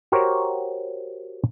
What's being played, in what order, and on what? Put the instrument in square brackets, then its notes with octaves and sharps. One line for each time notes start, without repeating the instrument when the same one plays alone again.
[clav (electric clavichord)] F#4 G4 A#4 C5 C#5